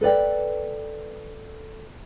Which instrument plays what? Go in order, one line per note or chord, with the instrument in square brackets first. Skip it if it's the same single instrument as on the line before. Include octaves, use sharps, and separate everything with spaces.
[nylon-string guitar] A4 B4 D5 G5